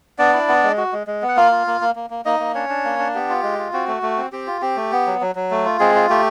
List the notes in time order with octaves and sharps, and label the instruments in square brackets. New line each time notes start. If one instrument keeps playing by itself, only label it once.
[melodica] B3 D4 D5
E4
B3
G#3
F#4
G#3
G#3
B3
F#5
A#3 F4 F5
F4
A#3
A#3
A#3
A#3
A#3 D#4 D#5
A#3
C#4 D4 C#5
D4
A#3
D4
B3 G4
F4
G#3
F4
C4 F#4
A3
A3
C4
C4 G4
F4
C4 G4
A3
B3
F#3
F#3
F#3
A3
F4
G#3 C4 G#4
F4
A3 G4